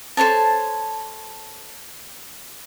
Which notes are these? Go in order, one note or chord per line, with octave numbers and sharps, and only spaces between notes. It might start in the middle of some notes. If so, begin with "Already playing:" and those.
A4 C5 C#5 A5